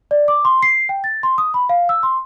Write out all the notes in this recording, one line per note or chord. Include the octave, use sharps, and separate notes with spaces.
D5
D6
C6
C7
G5
A6
C6
D#6
B5
F5
E6
C6